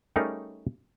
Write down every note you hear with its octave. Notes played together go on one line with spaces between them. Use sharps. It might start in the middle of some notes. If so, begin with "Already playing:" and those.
G3 A3 C#4 D#4 G#4 A#4